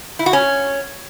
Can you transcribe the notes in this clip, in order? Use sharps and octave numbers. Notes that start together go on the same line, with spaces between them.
E4
F#4
C#4